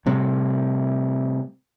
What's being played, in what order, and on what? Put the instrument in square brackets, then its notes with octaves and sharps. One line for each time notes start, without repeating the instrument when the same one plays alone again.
[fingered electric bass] A2 C3 G3